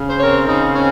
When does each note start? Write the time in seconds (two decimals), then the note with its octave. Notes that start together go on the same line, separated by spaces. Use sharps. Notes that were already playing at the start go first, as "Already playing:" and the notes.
Already playing: C#3
0.10 C5
0.20 C4 A#4 C#5
0.48 C#3 D#4
0.75 C4 C#4